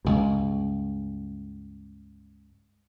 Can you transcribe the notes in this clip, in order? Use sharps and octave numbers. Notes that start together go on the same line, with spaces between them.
C#2 G2